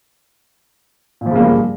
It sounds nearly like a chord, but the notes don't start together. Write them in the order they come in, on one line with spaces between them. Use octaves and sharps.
A#2 F3 C#3 A#3 G2